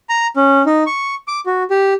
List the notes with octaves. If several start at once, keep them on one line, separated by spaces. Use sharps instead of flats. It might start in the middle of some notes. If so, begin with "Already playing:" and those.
A#5
C#4
D#4
C#6
D6
F#4
G4